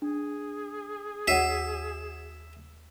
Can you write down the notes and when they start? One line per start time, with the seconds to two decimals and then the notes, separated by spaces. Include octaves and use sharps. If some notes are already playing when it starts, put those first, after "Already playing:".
0.02 D4 G#4
1.28 D#2 F#4 C#5 E5 F#5 C7 D#7